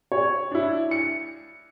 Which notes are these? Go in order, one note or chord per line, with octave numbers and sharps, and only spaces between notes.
C#5
D4 E4
C#7